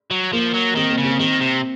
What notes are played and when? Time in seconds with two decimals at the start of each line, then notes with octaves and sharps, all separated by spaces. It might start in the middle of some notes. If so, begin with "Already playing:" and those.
0.11 F#3
0.33 F3 A#3
0.54 F#3
0.76 D#3 C4
0.90 A#3
0.98 C#3
1.05 C4
1.19 D#3 C4
1.41 C3